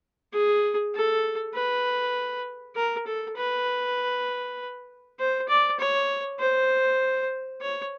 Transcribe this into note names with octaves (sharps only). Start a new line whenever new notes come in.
G#4
A4
B4
A#4
A4
B4
C5
D5
C#5
C5
C#5